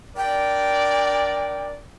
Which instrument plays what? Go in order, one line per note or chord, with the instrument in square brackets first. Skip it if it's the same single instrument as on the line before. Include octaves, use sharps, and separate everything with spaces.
[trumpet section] D4 A#4 D5 [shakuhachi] G5